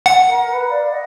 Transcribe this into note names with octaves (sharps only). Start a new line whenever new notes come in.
F#5
A#4
B4
D5 F5
D#5 F#5